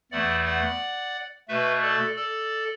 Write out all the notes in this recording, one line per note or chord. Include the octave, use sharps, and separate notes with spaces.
E2 E3 A3 D5 F#5
D5 F#5
B2 A3 B4 E5
A4 D5
A4 D5